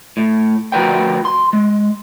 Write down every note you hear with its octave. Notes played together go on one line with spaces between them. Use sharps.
A2
D2 F3 F#4 A#4 B4 G5
C6
G#3